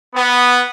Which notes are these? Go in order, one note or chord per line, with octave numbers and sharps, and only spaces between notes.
B3